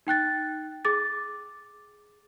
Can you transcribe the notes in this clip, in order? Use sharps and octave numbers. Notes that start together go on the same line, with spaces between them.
D#4 G5 F#6 A6
G#4 D6 A6